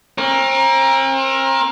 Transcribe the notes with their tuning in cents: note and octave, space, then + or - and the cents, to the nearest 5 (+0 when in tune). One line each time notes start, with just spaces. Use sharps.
C4 +40 A#4 +15